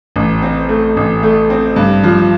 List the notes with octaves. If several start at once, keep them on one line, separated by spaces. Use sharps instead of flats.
A1
C4
A3
A1
A3
C4
G2
F3